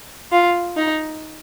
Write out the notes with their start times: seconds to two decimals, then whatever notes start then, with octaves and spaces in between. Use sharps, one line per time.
0.32 F4
0.76 D#4